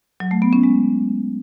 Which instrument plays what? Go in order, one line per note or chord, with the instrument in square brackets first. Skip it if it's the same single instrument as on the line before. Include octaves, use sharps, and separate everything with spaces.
[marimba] F#3
A3
B3
C#4
G#3